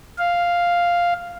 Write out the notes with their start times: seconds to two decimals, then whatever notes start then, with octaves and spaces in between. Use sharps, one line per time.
0.18 F5